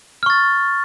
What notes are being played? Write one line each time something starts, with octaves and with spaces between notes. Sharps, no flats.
C#6 F6 A6